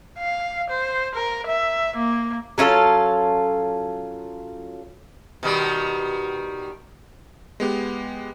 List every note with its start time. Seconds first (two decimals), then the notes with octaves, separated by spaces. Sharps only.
0.18 F5
0.70 C5
1.15 A#4
1.47 E5
1.96 A#3
2.58 F#3 C#4 F4 A4
5.43 B2 D#3 G3
7.60 G#3 B3 G4